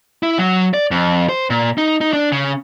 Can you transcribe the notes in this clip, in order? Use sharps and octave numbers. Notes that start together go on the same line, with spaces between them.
E4
F#3
D5
F2
C5
A#2
D#4
D#4
D4
C#3